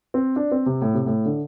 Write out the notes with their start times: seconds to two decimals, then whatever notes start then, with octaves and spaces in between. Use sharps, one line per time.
0.14 C4
0.36 D4
0.52 C4
0.66 C3
0.81 A2
0.94 C3
1.06 A2
1.25 D3